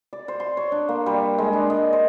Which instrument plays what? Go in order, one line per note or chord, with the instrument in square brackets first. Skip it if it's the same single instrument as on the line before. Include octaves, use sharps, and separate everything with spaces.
[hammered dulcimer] D5
C5
C6
C#5
D4
A#3
G3
G#3
D4
D#5
C5